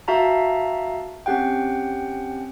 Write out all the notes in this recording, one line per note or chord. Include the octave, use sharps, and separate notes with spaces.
F#4 E5 F5 A5 A#5
C4 C#4 G4 F#5 G5